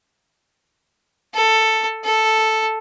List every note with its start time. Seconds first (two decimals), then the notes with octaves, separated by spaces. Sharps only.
1.34 A4
2.04 A4